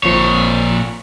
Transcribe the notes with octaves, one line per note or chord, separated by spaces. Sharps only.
A1 A#2 F3 C#5 C#7